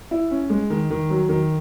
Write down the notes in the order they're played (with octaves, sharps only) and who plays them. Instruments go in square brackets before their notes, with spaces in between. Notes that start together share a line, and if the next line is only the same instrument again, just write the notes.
[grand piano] E4
C#4
G#3
D#3
D#3
F#3
D#3